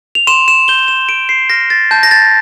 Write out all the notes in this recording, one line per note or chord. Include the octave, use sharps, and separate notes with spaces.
F7
C6 E7
E7
G6 G7
E7
C6 D7
C7
F6 A#6
A6
A5 G6
A#6
A6